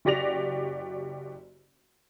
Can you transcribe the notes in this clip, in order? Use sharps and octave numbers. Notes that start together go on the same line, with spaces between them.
F#1 F#4 G4 D5 A#6 F7